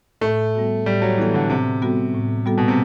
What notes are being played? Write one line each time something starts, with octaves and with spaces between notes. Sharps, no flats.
A2 A3
G3 B3 F#4 A4
A2 G3
F#3
E3 G3 B3 F#4 A4
D3
A2 C3
G3 B3 F#4 A4
A2
G3 B3 F#4 A4
B2
C3